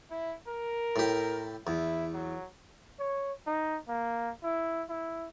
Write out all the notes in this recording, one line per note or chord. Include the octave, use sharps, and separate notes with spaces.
E4
A#4
A2 G4
E2 E4
F#3
C#5
D#4
A#3
E4
E4